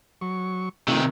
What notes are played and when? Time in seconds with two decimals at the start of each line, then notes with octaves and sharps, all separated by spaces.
0.21 F#3 C#6
0.88 C3 D#3 A3 D#4 F4